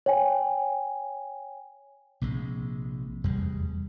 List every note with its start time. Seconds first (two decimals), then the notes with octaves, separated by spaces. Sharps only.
0.06 C#5 G5 G#5
2.22 A#1 C3 G#3
3.24 F1 E2 G3 G#3